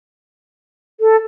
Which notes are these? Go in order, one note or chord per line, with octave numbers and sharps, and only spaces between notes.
A4